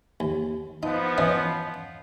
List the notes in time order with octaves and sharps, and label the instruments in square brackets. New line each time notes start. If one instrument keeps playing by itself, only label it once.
[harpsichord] D#2
[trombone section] F3 B3 [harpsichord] D#4
[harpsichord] E3 C#4 D#5